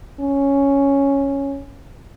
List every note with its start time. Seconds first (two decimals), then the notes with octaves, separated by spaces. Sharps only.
0.20 C#4